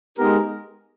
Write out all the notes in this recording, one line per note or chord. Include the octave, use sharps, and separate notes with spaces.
G#3 B3 D#4 G4 A#4